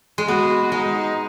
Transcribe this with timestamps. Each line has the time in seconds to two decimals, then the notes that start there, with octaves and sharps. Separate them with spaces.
0.18 G#3
0.28 B3 F#4
0.72 G#3 D#4